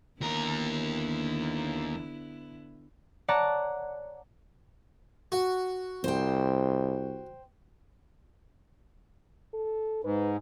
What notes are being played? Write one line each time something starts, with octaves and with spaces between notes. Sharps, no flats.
D#2 D3 B3 E4 A#4
C#5 D5 F#5 A5 A#5
F#4
C2 C5 G5
A4
G#2 B4